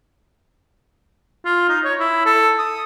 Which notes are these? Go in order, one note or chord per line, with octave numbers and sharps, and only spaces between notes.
F4
D#4
C#5
E4
A4
D#6